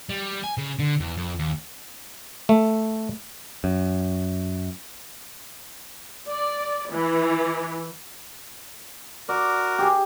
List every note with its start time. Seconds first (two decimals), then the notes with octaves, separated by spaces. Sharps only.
0.09 G3
0.44 G#5
0.58 C#3
0.79 D3
1.00 E2
1.17 F2
1.39 D#2
2.49 A3
3.64 F#2
6.28 D5
6.91 E3
9.29 F#4 A#4 D5
9.79 G4 G#4